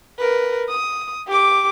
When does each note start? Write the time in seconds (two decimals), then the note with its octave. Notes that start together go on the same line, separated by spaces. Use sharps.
0.18 A#4 B4
0.69 D#6
1.27 G4 D6